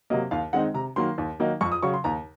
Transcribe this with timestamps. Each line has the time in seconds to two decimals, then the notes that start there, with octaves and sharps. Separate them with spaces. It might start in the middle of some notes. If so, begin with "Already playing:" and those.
0.10 C3 F#3 A#3 D#5
0.31 D#2 F5
0.53 D#3 G#3 C4 D#4 F#5
0.74 C3 A#5
0.96 D#3 F#3 A#3 C6
1.18 D#2
1.40 D#3 F#3 A#3 D#4
1.61 F2 C#6
1.72 D#6
1.82 C#3 F#3 C#6
1.94 C6
2.04 D#2 A#5